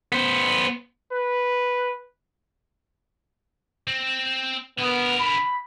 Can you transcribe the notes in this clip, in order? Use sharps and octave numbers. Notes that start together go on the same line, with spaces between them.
B3 C5
B4
C4
D3 B3 A#4
B5